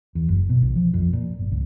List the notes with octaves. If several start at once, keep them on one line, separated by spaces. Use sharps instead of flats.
E2
F#1
B2
B1
F3
F2
A#2
G1
C#2